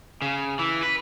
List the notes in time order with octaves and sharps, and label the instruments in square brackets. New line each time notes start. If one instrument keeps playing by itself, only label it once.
[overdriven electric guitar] C#3
E3
B4